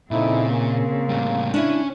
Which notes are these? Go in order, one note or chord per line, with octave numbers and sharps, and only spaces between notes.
F2 A#2 C#3 C4 D#4 E4
A#3
A2 G3
C#4 D4 E4